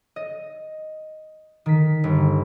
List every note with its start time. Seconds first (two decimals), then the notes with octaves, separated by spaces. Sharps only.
0.16 D#5
1.66 D#3 B6
2.04 G1